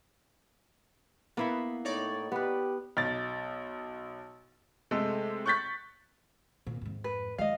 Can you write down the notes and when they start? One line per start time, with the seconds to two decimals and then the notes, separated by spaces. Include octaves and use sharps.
1.37 A#3 B3 E4 E5
1.85 A2 D#4 C#5 D5
2.32 B3 G4 B4
2.97 B1 A6
4.91 C3 G#3 A3 A4
5.46 C#6 F#6 G6 A6 B6
6.67 A#2
6.82 F2 G#2
7.04 B4
7.38 F3 G#3 D#5 F5